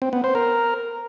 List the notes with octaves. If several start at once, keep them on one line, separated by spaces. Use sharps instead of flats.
C4
B3
C5
A#4